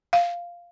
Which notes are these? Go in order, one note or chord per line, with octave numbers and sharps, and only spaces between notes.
F5